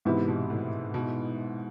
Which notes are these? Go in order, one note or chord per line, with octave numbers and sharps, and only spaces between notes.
G#2 C3 E3 B3 E4
C3
B2
A2
B2